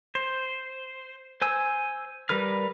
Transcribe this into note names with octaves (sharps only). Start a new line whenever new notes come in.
C5
C5 G#5 E6
G3 A#4 B4 F6